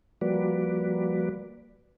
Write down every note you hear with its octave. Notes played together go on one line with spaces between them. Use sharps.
F3 G3 A#3 F#4 B4 D5